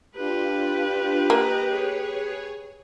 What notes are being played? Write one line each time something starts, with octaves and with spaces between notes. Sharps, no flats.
D4 F4 G4 B4
A#3 D#5 A#5
G#4 C#5